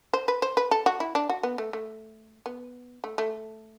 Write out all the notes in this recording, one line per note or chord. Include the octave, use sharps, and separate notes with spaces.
C5
B4
C5
B4
A4
F#4
E4
D4
F#4
B3
A3
A3
B3
A3
A3